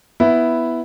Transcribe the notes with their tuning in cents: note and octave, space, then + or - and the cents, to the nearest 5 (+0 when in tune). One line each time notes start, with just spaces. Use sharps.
B3 +0 E4 +0